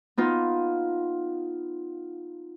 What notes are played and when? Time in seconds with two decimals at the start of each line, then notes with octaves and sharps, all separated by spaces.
0.17 B3 D#4 F4